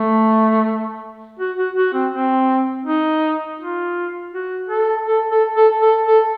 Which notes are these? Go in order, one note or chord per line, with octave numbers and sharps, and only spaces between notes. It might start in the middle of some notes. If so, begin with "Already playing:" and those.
Already playing: A3
F#4
F#4
F#4
C4
C4
D#4
F4
F#4
A4
A4
A4
A4
A4
A4